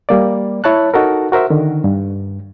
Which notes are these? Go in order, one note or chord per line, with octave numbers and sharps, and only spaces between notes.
G3 A#3 D5
E4 C#5 A5 F#6
D#4 F#4 A4 A#4
F#4 A#4 C5 E5
D3 D#3
G2